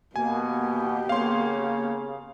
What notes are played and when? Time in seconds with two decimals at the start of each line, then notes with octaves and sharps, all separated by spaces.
0.16 B2 A#3 B3 G4 G#5
1.09 C#3 A#3 C#5 F5 C6